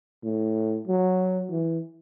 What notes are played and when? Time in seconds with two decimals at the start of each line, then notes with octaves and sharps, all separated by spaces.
0.24 A2
0.87 F#3
1.50 E3